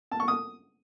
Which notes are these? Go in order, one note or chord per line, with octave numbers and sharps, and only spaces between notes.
A5
C#6
D#6